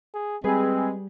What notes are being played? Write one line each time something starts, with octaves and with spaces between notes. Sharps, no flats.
G#4
G3 G#3 C4 G#4 B4